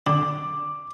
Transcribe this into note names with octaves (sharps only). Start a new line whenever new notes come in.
D3 D6